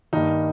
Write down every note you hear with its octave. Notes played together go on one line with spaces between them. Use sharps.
G2 D#3 A#3 D#4